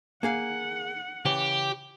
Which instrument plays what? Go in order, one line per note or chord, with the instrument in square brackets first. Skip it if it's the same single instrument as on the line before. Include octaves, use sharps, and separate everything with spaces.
[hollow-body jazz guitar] A#3 G#4 F5 [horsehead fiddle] F#5
[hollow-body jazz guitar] C#3 E3 [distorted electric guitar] G4